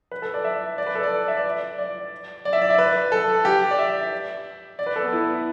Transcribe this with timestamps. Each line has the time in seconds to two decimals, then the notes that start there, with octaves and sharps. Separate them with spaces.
0.12 B4
0.22 A4
0.34 D5
0.44 E5
0.78 D5
0.87 B4
0.95 A4
1.03 D5
1.28 E5
1.37 D5
1.78 D5
2.45 D5
2.53 E5
2.62 D5
2.70 E5
2.79 B4
3.12 A4
3.45 G4
3.71 D5
3.79 E5
4.79 D5
4.86 B4
4.96 A4
5.03 B3
5.13 E4